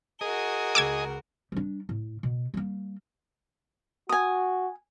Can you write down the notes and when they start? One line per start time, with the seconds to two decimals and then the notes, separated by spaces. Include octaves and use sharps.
0.21 F#4 G#4 A#4 D#5
0.75 C#2 C#3 D6 E6 G#6
1.52 G3 D4
1.89 A2
2.23 B2
2.54 G3 A#3
4.09 F#4 G#5 D#6